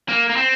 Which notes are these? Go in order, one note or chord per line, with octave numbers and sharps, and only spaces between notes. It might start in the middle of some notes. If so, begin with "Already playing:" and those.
A#3
A#3
C4